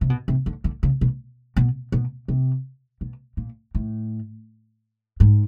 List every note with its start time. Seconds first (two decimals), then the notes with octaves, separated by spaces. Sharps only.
0.01 C3
0.10 B2
0.28 C3
0.46 D3
0.64 D3
0.83 C#3
1.01 B2
1.56 B2
1.92 B2
2.28 C3
3.01 B2
3.37 A#2
3.75 A2
5.20 G#2